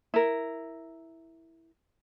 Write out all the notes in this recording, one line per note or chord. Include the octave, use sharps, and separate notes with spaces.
E4 A#4